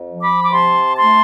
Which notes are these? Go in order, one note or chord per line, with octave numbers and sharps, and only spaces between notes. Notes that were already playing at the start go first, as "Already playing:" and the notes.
Already playing: F2
F3
B5 D6
D6
C3 A5 C6
A3 A5 C6